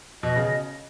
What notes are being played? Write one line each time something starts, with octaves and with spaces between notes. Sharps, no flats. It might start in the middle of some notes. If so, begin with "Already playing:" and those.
B2 D#5
C#3